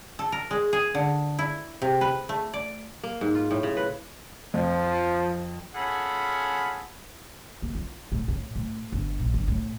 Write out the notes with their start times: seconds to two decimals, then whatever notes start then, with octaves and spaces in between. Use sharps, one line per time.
0.19 A4
0.32 A#4
0.51 G#3
0.73 G#4
0.95 D3
1.39 E4
1.82 C3
2.01 B4
2.29 A3
2.54 D5
3.04 A#3
3.21 G#2
3.35 F4
3.51 A2
3.63 C#3
3.77 B4
4.54 F2 F3
5.75 C#4 F4 G#4 A4 F#5 B5
7.62 A#3
7.75 F4
8.12 A2
8.28 A2
8.56 A2
8.92 G1
9.19 A#1
9.34 G1
9.48 A2